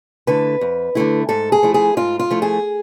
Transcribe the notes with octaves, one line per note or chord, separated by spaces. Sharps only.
D3 A3 E4 B4
F2
D3 A3 E4
G#2 A4
G#4
F3 A3 E4
G#4
G#2 F4
F4
F3 A3 E4
G#4